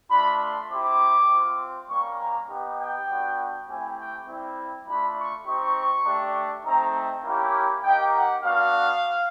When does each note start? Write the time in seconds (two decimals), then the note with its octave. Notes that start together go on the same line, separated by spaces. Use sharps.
0.11 A3 D4 F4 B5
0.41 C6
0.71 C4 E4 G4 D6
1.30 C4 F4
1.89 G3 A#3 C#4 C#6
2.19 A#5
2.49 B3 D#4 G4
2.79 G5
3.08 G3 B3 D4 F#4
3.68 A3 C4 E4 G4 G#5
3.97 G5
4.27 G3 C4 E4
4.86 A3 D4 F4 B5
5.16 C#6
5.46 C4 D#4 G4 C#6
6.05 A3 D4 G4
6.65 A3 C4 D#4 A#5
7.24 A#3 C#4 E4 G4
7.84 A#3 D#4 G4 G5
8.14 F#5
8.43 B3 D4 F#4 F5